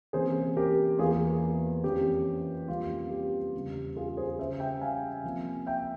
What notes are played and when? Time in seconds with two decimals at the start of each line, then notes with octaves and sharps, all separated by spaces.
0.13 C3 E3 A#3 C#4 G#4 C5
0.57 G4 A#4
0.98 E2 E3 A#3 F4 G#4
1.84 F2 E3 A#3 C#4 G4
2.68 F2 C3 G3 A#3 C#4 F4
3.11 G4
3.54 E2 C#3 G3
3.96 F4 G#4
4.17 G#4 C5
4.38 C#3 G3 C#4 C5 E5
4.60 E5 G5
4.81 F5 G#5
5.24 C3 F3 A#3
5.66 E5 G5